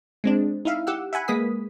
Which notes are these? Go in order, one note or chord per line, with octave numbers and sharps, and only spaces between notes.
G#3 C4 D4
D#4 E4 E5 F5
G4 F#5 E6
E5 F#5 G#5 B5
G#3 A#3 B4 D#6 B6